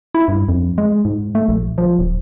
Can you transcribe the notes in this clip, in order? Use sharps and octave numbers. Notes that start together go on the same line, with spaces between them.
E4
G2
F2
G#3
G#2
A3
A#1
F3
D1